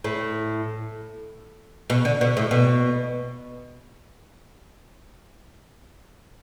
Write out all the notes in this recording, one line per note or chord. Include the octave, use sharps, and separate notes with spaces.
A2
B2
D3
B2
A2
B2